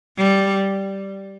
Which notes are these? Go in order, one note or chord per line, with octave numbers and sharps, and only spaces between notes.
G3